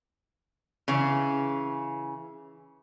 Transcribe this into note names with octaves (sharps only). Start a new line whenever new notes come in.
C#3 E3